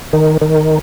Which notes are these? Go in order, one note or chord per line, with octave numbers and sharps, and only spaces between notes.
D#3
D#3